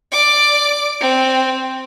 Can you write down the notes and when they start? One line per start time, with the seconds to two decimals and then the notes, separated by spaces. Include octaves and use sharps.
0.12 D5 D6
1.00 C4